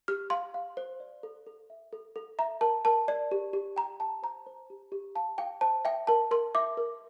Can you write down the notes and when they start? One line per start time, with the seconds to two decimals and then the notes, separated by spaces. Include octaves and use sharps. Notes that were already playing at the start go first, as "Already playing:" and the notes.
0.08 G4 F6
0.30 F5 C6
0.54 F5
0.77 C5
1.00 D5
1.23 A4
1.47 A4
1.70 E5
1.93 A4
2.16 A4
2.39 E5 A#5
2.61 A#4 A5
2.85 A#4 A5
3.08 D5
3.31 G4
3.53 G4
3.76 G5 A#5
4.00 G5 A5
4.23 C5 A#5
4.46 C5
4.70 G4
4.92 G4
5.15 F5 A5
5.38 F5 G5
5.61 C5 A5
5.85 E5 G5
6.07 A#4 A5
6.31 A#4 C6
6.55 E5 D6
6.77 A#4